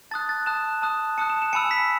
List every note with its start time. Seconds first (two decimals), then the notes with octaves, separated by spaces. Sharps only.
0.11 A5 D#6 F#6 A6
0.29 A6
0.46 A5 D#6 F#6 E7
0.82 A5 D#6 F#6
1.18 A5 D#6 F#6 C#7
1.30 E7
1.42 E7
1.53 G#5 B5 E6 C#7
1.71 B6